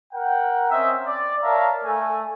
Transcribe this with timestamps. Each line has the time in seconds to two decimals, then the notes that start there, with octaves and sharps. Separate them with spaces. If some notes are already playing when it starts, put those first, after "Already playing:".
0.13 A#4 F#5 G5
0.70 C4 C#4 D#5 E5
1.07 D5
1.43 A#4 C#5 E5 F5 A5 A#5
1.84 A3 A4 G#5